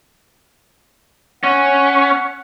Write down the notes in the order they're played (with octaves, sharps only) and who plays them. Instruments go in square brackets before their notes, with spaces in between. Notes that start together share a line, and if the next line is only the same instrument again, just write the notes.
[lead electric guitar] C#4 [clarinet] F#5